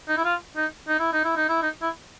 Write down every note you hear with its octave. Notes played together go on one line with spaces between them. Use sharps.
D#4
E4
F4
D#4
D#4
E4
D#4
E4
D#4
E4
D#4
E4